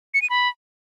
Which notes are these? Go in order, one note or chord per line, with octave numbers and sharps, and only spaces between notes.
C#7
D#7
B5